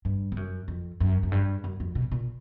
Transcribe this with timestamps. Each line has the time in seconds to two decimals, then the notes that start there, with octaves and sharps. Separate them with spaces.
0.05 G2
0.32 G2
0.37 F#2
0.68 F2
1.00 F#2
1.23 F#2
1.32 G2
1.64 F#2
1.80 F2
1.95 B2
2.12 A#2